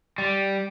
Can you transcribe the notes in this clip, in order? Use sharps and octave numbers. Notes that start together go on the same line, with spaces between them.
G3